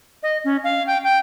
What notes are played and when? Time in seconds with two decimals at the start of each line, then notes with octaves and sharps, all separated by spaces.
0.23 D#5
0.44 C#4
0.64 F5
0.87 G5
1.04 G5